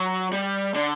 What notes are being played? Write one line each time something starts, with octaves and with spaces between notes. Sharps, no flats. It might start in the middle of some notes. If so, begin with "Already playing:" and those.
Already playing: F#3
G3
D3